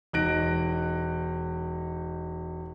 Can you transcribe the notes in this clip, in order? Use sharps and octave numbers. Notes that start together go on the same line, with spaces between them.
E1 D#4 F#6 A#6 D7